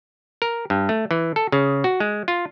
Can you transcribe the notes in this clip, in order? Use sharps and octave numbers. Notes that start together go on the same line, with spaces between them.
A#4
G2
A3
E3
A4
C#3
F#4
G#3
F4